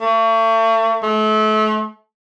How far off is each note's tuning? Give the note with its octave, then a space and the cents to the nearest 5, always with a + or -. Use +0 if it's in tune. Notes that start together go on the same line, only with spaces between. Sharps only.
A3 +40
A3 -35